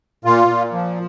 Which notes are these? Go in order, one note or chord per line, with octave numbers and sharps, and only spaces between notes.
A#2 F4
A#2
F3